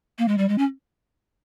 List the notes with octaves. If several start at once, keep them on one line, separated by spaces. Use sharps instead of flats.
A#3
G#3
G3
G#3
C#4